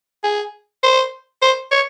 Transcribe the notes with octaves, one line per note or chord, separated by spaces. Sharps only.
G#4
C5
C5
C#5